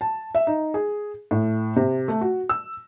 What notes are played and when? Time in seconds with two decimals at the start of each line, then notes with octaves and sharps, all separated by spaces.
0.01 A5
0.35 E5
0.47 D#4
0.74 G#4
1.31 A2
1.76 C3
2.08 A3
2.21 F#4
2.49 E6